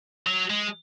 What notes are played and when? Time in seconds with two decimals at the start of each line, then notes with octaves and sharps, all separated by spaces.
0.27 F#3
0.50 G#3